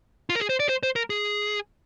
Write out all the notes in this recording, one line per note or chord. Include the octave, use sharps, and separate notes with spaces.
F4
A#4
G#4
C5
D5
C5
C5
A#4
G#4